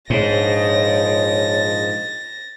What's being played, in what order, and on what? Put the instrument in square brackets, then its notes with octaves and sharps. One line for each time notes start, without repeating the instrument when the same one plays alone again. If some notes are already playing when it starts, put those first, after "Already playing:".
[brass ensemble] A#1 F3 D#5 [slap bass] G#2 [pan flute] C#5 [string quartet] A6 A#6